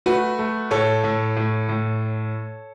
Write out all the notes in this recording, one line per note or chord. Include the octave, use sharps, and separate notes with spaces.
A3 F#4 B4
A3
A2 A4 C#5
A2
A2
A2